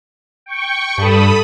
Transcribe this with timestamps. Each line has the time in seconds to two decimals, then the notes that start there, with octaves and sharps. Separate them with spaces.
0.46 G5 C#6
0.98 G2 A4 B5 D#6